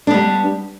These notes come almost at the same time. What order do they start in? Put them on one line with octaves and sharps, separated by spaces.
D4 B3 G3